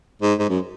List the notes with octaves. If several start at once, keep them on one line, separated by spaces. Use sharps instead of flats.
G#2
G#2
F#2